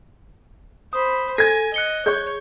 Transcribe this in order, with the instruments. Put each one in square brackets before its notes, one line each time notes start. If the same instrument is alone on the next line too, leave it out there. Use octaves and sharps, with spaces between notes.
[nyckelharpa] C5 B5 [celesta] D#6
[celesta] A4 [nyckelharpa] G#5 [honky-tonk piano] G#6 A#6
[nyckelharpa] D#5 [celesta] F#6 C#7 G7
[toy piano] G#4 D5 C#6 [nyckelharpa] C#5 [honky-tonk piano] G6